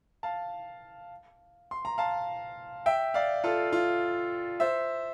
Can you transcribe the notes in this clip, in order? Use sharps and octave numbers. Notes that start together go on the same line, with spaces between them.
F5 A5
C6
A#5
F5 A5
E5 G5
D5 F5
F4 A4
F4
C5 E5